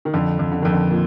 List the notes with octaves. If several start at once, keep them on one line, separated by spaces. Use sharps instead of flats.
D#3
F2 D3
F2
D3
F2 D#3
D3
A#2